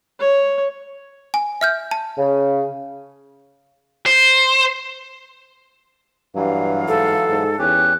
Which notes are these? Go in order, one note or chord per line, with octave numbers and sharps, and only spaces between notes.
C#5
G#5
E5 F6 G6
A5
C#3
C5
G2 E3 F#3 F5
G#2 A4
G#2
E2 C#4 G4 F#6